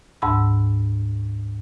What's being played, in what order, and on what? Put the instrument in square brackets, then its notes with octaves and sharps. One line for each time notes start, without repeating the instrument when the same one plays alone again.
[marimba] D2 G#2 A5 B5 E6